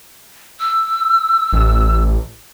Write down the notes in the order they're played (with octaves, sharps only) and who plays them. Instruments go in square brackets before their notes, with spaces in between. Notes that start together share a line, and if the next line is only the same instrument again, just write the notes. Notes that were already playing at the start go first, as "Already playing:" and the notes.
[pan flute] E6
[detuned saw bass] A1